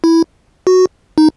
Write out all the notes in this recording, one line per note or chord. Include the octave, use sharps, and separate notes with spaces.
E4
F#4
D#4